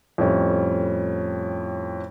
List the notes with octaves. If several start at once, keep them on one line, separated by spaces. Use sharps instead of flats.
F2 A2 G3 C#4 E4